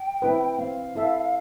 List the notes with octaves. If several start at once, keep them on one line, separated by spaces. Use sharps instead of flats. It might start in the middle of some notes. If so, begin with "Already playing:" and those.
Already playing: G5
C4 E4 B4
C4 F5
E4 A4 E5